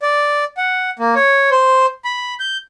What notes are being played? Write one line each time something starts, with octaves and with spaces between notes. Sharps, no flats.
D5
F#5
A#3
C#5
C5
B5
G6